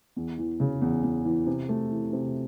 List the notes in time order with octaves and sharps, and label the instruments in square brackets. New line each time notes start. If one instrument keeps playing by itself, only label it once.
[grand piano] E2
E3
C#3
E2
E2
E3
C3
A3
E3
C3